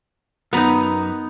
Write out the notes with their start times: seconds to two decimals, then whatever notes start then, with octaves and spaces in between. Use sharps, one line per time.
0.53 F#2 B3 D#4 A#5